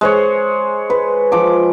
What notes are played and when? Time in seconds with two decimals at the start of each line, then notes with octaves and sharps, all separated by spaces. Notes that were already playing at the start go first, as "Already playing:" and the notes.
0.01 G#3 C5 C#5
0.90 B4
1.32 F3 D6